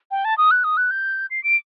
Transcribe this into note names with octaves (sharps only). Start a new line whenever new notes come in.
G5
A5
D#6
F#6
D#6
F#6
G6
C7
D7